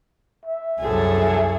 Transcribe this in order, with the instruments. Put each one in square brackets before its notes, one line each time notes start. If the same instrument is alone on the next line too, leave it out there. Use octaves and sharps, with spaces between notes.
[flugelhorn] E5
[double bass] C2 F#2 [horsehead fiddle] G#4 A4